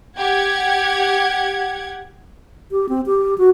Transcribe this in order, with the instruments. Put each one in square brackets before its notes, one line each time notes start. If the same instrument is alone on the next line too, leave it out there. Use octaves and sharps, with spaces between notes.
[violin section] G4 F#5 G#6
[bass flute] G4
C4
G4
F#4